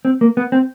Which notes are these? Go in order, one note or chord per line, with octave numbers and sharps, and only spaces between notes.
C4
A#3
B3
C4